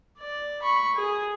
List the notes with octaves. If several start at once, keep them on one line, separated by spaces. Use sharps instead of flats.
D5
B5 C#6
G#4